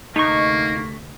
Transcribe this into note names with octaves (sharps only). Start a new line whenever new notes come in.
D2 C3 A3 A#3 D#4 C#6